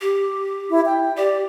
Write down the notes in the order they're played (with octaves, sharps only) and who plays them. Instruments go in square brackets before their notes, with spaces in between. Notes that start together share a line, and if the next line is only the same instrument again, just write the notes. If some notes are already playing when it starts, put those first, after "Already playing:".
[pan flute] G4
[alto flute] E4
G5
[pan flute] G4 [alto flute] D5